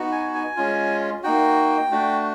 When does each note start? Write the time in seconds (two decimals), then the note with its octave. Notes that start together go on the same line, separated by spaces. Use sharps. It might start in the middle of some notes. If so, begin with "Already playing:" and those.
Already playing: B3 D#4 F#4
0.12 G#5
0.34 G#5
0.57 G#3 C#4 F4
1.23 A#3 D#4 F#4 G5
1.91 A3 D4 F#4